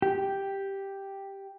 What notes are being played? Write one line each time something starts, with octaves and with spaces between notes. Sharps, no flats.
G4